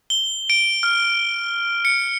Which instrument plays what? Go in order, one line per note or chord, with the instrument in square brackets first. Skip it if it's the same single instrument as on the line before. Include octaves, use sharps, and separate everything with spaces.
[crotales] G7
D7
F6
C#7